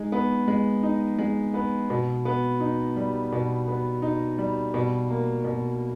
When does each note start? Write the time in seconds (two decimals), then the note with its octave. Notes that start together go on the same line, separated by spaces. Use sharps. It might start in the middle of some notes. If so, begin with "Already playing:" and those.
Already playing: G#3 D#4
0.12 B3
0.48 G#3
0.83 D#4
1.18 G#3
1.54 B3
1.90 B2
2.25 B3
2.60 D#4
2.96 G3
3.32 B2
3.68 B3
4.02 D#4
4.38 G3
4.74 B2
5.09 A#3
5.44 B2